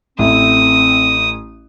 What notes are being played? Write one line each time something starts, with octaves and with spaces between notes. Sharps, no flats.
A1 A3 C4 E4 D#6